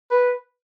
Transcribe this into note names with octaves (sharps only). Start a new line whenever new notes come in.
B4